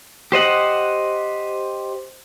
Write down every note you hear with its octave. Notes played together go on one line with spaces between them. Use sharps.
G4 C5 D#5 F#5